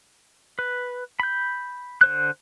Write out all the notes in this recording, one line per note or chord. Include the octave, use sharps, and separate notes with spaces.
B4
B5 G6
D3 C5 F#6